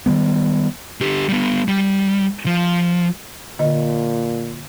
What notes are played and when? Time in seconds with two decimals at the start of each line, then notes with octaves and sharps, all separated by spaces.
0.06 D#3 E3 G3 B3
1.01 D3 G4
1.29 G3 B3
1.68 G3
2.46 F3
3.59 A#2 D3 D#5